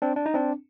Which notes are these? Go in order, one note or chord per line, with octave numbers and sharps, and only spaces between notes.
C4 D4
D4
D#4
C4 D4